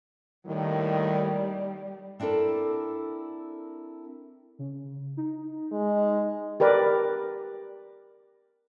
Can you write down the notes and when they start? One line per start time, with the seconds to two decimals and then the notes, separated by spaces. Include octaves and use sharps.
0.47 D#2 A2 D#3 G3
2.20 C4 D4 E4 A4 A#4
4.59 C#3
5.17 D#4
5.72 G#3
6.60 G4 A#4 B4 D5